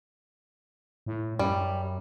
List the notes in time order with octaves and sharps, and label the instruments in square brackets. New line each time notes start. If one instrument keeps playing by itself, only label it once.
[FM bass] A2
[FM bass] F#2 [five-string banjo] G3